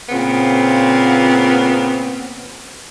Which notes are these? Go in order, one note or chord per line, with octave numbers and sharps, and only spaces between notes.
A#2 C#3 B3 C4